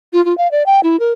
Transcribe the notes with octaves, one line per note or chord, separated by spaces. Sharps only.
F4
F4
F5
D5
G5
E4
A#4